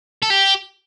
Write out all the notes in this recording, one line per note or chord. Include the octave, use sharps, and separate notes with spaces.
A4
G4